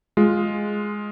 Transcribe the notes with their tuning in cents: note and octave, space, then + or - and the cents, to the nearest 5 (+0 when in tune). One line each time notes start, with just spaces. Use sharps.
G#3 +0 F4 +5